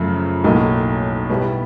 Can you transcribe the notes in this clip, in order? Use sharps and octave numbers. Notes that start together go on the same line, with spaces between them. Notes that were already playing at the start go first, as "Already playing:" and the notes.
Already playing: F#2 C#3 F3 A3
B1 A2 F#3 A#3 D#4
B2 G3 B3 E4